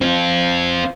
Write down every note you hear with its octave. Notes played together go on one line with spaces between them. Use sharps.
C4 F4